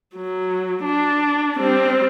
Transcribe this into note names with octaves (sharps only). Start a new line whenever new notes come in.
F#3
D4
G3 C4